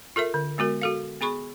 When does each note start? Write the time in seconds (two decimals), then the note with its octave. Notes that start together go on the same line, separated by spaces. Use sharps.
0.16 F4 A4 A#4 E5
0.34 D3
0.58 G#3 B3 F#4 A#4
0.82 F#4 A4 F5
1.21 B3 G#4 B5 C#6